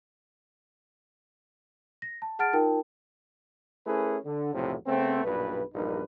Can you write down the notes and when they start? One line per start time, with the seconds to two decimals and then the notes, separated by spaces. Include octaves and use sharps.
2.02 A#6
2.22 A5
2.39 G#4 F#5 A5 F6 A6 D7
2.53 D#4 F4 A#4 G5 A5
3.86 A3 C#4 E4 G#4 A#4 B4
4.24 D3
4.54 B1 E2 A2 C3 F3 F#3
4.87 C#3 A3 B3 C4
5.24 B1 G2 A#2 B4
5.74 A#1 E2 G2 D#4 A#4 B4